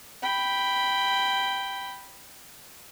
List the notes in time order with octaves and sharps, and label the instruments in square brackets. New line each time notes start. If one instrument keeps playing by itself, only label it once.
[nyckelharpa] G5 B5